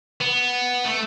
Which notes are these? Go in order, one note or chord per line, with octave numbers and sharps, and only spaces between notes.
B3
A3